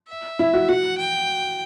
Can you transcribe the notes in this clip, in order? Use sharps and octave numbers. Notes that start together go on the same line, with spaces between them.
E5
E4
F#4
F#4 F#5
G5